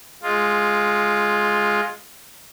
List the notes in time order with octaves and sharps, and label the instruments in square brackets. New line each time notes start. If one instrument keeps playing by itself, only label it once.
[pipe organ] G#3 F4